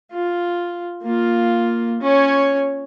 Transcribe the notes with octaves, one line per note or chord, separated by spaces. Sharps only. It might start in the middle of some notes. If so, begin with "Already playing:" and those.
F4
A#3 F4
C#4 C#5